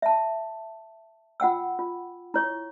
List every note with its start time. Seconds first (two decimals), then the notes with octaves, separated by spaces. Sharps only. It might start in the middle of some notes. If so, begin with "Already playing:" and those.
0.02 E5 A5
1.40 F4 F#5 G5 E6
1.79 F4
2.34 E4 C#5 C#6